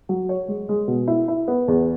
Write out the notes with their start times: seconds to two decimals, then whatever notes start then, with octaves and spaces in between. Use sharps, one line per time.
0.09 F#3
0.29 C#5
0.48 G#3
0.69 G#3
0.88 B2
1.08 E4
1.28 E4
1.48 B3
1.68 E2